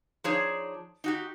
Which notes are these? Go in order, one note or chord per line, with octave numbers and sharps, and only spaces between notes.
F3 D4 D#4 G#4 C5 C#5
D#4 F#4 G4